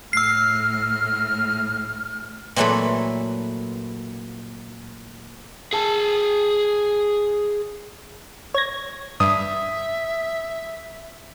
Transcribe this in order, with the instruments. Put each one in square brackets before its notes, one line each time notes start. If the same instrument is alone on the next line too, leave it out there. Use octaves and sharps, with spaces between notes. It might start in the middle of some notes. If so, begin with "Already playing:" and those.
[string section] A2 [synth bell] E6 C7 [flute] F6
[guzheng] A#2 E3 F#3 A3 E4 A4
[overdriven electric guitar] G#4 A5
[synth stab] C#5 G#6 A#6
[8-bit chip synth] G2 [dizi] E5 [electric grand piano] D#6